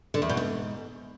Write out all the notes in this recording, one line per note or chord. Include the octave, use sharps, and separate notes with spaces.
D3
E2
B2
G#2